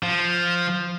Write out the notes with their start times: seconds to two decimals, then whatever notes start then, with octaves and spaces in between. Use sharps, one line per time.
0.03 F3